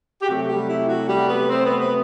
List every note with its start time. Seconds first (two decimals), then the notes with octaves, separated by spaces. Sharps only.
0.22 G4
0.27 C3 F#3 A3 F#4
0.49 G3 G4
0.69 E4
0.89 F#4
1.09 G3 G4
1.29 B3 B4
1.50 C4 C5
1.65 B3 B4
1.81 B3 B4